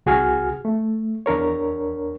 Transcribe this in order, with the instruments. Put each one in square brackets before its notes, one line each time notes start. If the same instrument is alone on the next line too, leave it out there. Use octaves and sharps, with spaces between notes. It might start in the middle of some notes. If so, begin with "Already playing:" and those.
[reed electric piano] C2 F#4 G#4 G#5 F6
A3
E2 D4 A#4 C#5